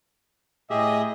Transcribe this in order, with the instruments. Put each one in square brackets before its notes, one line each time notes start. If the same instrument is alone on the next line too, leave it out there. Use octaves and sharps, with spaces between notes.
[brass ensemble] A2 D#5 [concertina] G4 G#4 E5